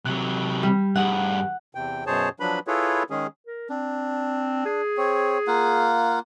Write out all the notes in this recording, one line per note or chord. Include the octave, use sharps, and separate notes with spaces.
C3 F#3 F#6
G3
G2 G#4 F#5
E2 C3 G5
F#2 B2 G#4 C5 C#5 A5
F3 F#3 D4 B4 B5
E4 F4 G#4 A4 B4 C#5
D#3 G#3 C#4 G#4
A#4
C4 D4
G#4
C4 C#5
A#3 F4 F#5